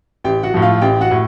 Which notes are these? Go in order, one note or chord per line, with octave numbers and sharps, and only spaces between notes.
A1 G4 G5
F#4 F#5
A2 F3
F4 F5
A1 G4 G5
F#4 F#5
A2